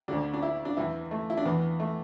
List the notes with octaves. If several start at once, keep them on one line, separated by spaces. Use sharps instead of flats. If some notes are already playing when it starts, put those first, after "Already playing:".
D2 D3 D4
D4
E4
D4
E2 E3 E4
A3
E4
D4
E2 E3 B3
A3